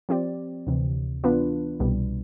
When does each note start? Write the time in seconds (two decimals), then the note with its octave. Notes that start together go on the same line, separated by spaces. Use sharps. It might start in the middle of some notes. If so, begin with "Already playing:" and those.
0.09 F3 C4 G4 D5
0.67 D2 C3 E3
1.24 E3 B3 D4 F4 B4
1.80 C2 B2 G3